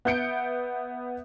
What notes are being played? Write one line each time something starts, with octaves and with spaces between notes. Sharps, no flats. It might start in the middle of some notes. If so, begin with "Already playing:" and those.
B3 E5 G6 C#7 D7